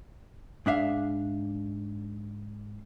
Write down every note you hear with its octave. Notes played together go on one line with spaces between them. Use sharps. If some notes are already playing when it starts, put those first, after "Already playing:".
G#2 D4 E5 F5